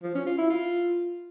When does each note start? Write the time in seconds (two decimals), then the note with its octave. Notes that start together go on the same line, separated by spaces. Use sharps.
0.03 F3
0.15 C#4
0.26 F4
0.38 E4
0.50 F4